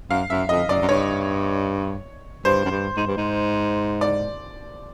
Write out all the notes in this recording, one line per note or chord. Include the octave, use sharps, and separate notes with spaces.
F#2 F5
F#2 E5
F2 D#5
F#2 D5
F#2
G2 C#5
G2 C5
F#2
G2
G#2
G2
G#2
D5